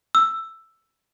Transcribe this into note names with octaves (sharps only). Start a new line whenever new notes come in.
E6